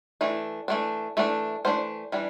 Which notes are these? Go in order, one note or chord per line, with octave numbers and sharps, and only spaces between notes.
E3 A3 D4
E3 A3 D4
E3 A3 D4
E3 A3 D4 C5
E3 G3 D4